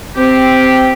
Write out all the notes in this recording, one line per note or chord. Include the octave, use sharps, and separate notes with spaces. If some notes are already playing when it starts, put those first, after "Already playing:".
C4 G4